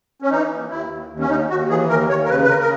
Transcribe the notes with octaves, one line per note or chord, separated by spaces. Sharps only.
C#4
E3 D#4
D#2
D#2 E4
D#2
D#2
C#4
D#2 D#4
D#2 F#4
E3 G#4
D#2 A#4
D#2 C#5
A#4
C#3 B4
B4
C#3 A#4
A#4